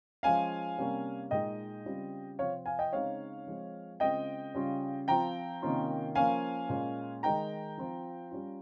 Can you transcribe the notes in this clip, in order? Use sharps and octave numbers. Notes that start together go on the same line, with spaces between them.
F3 G#3 C#4 F5 G#5
C3 G3 A#3 C#4
A#2 G#3 D#4 D#5 G5
C#3 G3 C4 F4
C3 F3 C4 F4 C#5 F5
F5 G#5
D#5 G5
C#3 G#3 C4 D#4 C#5 F5
F3 G#3 C4
C#3 G#3 C4 F4 D#5 G5
C#3 G3 C#4 F4
F3 C4 F4 G5 A#5
C3 D#3 A#3 C#4 F4
F3 A#3 C#4 F5 G#5
A#2 G#3 C#4
D#3 G#3 D#4 G5 A#5
F3 C4 F4
G3 C#4 F4